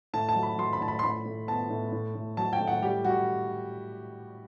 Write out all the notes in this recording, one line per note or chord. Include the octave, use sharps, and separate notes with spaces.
A2 A5
A5
F#3
B5
F#3 C6
B5
A2 A5
B5
C6
A2 B5
A2
B3 A5
A2
A2
A2
F#3 A5
G5
A2
F#5
G3 G4
G3 F#4